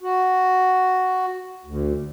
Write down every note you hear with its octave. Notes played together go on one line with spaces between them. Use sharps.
F#4
D2